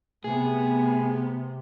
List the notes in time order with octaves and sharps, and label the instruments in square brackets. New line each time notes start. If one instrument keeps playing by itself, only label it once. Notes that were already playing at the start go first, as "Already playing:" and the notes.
[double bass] C3 [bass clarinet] A3 [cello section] B3 [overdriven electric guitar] G#4